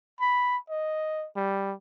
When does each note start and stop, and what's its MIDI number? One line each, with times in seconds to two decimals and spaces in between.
0.20 0.57 83
0.70 1.26 75
1.36 1.73 55